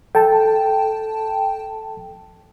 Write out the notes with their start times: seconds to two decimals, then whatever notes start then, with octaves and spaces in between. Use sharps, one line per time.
0.15 A4 G5 A5